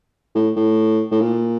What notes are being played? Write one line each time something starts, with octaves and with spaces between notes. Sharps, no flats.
A2
A2
A2
A#2